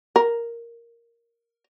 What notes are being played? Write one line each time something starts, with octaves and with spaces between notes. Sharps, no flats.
A#4